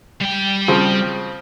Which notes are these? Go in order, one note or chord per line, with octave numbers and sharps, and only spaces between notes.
G3 G5
C#3 F3 C4